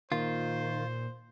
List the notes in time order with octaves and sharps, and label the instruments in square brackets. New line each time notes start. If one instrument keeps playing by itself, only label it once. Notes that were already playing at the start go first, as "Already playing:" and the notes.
[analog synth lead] A#2 [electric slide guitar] D#3 [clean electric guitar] F4 [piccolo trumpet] C5